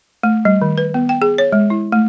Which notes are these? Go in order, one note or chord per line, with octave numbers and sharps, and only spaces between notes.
A3
G3
D#3
B4
B3
G5
G#4
C#5
G#3
E4
A3